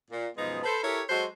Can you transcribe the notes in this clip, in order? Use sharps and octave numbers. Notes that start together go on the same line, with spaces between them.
A#2
F#2 B2 F3 G#3 B3 D#4
A4 B4 C5
E4 G4 A4 A#4 C#5
F#3 G#3 F#4 A4 C5